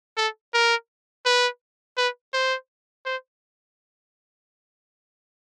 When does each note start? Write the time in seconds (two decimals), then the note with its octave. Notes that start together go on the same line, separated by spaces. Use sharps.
0.17 A4
0.54 A#4
1.26 B4
1.97 B4
2.33 C5
3.05 C5